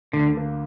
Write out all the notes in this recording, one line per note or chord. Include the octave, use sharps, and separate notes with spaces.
D2 D3
D3 A#3